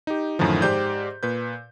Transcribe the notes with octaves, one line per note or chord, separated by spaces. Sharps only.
D#4 G4
F#2 A2 D3 D#3 F3
G#2 G4 C5 D5 G6
A#2 B4 G6